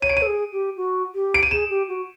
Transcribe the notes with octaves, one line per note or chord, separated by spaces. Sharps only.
C#5 D#7
D7
D#7
A4
G#4
G4
F#4
G4
D7
D#7
G#4 E7
G4
F#4